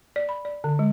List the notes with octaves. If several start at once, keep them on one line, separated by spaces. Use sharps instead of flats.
D5
B5
D5
D3
G#3